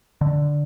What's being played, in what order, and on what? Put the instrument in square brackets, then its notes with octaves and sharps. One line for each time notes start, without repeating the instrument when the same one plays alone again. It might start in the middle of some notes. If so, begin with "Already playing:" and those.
[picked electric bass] D3